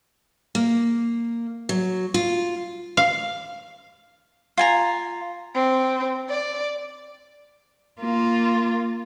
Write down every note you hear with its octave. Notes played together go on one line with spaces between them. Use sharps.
A#3
F#3
F4
F5
F4 G#5 A#5
C4
D5
A#3 F4